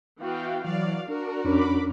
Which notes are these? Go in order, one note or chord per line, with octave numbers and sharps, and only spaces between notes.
E3 B3 F#4 F5 G5
E3 F#3 F#4 D5 F5
D4 F#4 A#4
F2 C#4 D4 B5 D6